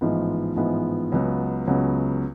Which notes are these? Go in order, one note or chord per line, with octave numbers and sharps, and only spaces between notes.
A1 G#2 F3 G#3 B3
A1 G#2 F3 G#3 B3
C#2 C#3 F#3 B3
C#2 C#3 F#3 B3